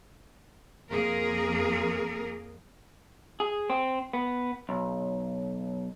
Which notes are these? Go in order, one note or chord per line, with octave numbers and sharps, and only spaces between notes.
F2 A#3 G#4 A#4
G#4
C4
B3
B1